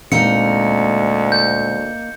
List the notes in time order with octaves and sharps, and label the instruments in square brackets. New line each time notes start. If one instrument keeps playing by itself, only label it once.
[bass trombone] D2 [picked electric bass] A#2 G#3 C4 [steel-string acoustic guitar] A#3 D#4 [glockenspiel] C#7
[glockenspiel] G6